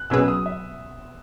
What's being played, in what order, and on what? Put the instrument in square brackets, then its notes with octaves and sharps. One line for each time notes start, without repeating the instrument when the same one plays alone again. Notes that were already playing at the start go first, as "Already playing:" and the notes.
Already playing: [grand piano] F#6
[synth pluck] B2 F#3 C#4 G#4 B4 [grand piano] E6
[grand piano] D#6
E5